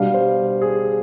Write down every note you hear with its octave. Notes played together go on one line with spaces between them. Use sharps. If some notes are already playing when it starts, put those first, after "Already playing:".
Already playing: B2 G3 D4 F5
C5
G#4